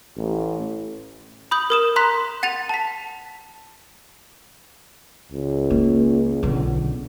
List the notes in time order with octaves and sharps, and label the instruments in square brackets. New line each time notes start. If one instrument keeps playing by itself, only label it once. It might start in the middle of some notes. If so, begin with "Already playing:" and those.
[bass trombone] A1
[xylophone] B5 D#6 G6 F#7
A#4 D#6 E7
A#5 C6 F#6 B6
F#5 A6 D#7 F7
A5 B6
[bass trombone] C#2
[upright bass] A#3
B1 D3